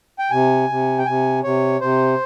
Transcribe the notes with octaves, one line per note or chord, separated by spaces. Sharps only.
G5
C3 G#5
C3
G5
C3 G#5
C3 C#5
C3 C5